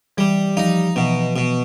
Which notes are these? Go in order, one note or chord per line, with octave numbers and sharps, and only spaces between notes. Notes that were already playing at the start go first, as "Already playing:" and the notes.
E3 G3
F3 D#4
B2 E3
B2